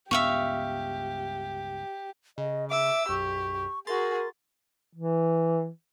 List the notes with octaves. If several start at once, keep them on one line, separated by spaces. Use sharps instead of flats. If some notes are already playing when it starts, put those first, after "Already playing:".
C#2 G2 B3 G4 E5 F5 C#6
C#3 D#5
E5 D6 E6
B1 F#2 G4 C#6
F#4 G#4 A#4 A#5 C6 A6
E3